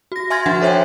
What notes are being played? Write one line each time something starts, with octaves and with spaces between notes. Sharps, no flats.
F#4 A#6
E5 G#5 C6 F6 G#6 A6
F3 D4 F#4 F#5
A4 C5 C#5 E5 G5 G#5